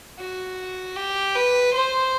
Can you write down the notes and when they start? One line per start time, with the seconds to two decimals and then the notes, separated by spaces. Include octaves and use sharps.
0.19 F#4
0.96 G4
1.35 B4
1.73 C5